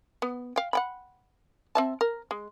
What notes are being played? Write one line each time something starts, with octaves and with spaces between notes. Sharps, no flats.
B3
F5 G5
F#5 G5 B5
C4 E5 A5
A#4
G#3